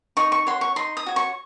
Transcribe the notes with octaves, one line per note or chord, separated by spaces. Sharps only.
D#4 C#6
C#6
F#4 C#5 C6
C#6
D#4 C6
D#6
F#4 C#5
C#6